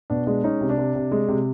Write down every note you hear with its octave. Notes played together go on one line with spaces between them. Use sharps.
B2 D4
G#3 D4
G#3 C#4 D#4
C3
D4
C3
C3
G#3
C3